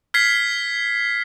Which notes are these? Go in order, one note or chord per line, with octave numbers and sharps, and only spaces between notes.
F6 G#6 B6 C7